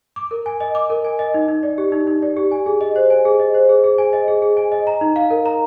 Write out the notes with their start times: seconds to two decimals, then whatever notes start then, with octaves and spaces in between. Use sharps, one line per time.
0.16 D6
0.31 A#4
0.46 G#5
0.60 D#5
0.75 D6
0.90 A#4
1.04 G#5
1.19 D#5
1.34 D#4
1.48 D#4
1.63 D5
1.78 G4
1.92 D#4
2.07 D#4
2.22 D5
2.37 G4
2.51 G#5
2.66 G#4
2.81 D#5
2.96 C5
3.10 G#5
3.25 G#4
3.40 D#5
3.54 C5
3.69 G#4
3.84 G#4
3.98 G#5
4.13 D#5
4.28 G#4
4.42 G#4
4.57 G#5
4.72 D#5
4.87 A#5
5.01 D#4
5.16 F5
5.30 A#4
5.46 A#5